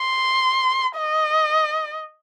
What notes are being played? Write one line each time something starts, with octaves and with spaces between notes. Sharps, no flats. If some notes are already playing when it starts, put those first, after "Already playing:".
Already playing: C6
D#5